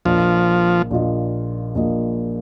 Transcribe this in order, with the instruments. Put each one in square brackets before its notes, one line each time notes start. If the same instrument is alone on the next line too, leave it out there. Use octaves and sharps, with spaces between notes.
[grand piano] A#1 A#2 A#3 F4 D#5 [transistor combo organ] F3
[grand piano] A#1 A#2 A#3 F4 D#5
A#1 A#2 A#3 F4 D#5